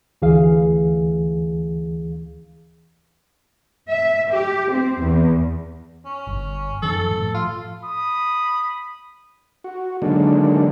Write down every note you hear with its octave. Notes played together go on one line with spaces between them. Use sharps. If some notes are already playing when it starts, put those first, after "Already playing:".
D2 E3 G#4 F5
E5
G4
C4
E2
C#4
G1
F#2 D#3 F3 A4
A2 F3
F4
B5 D#6
F#4
D3 D#3 F#3 G#3 A#3 D4